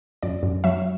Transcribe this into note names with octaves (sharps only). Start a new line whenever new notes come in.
F#2 D5
F#2
F#3 E5